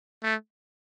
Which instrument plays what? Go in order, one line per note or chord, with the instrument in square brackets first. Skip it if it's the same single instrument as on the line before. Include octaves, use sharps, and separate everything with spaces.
[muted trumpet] A3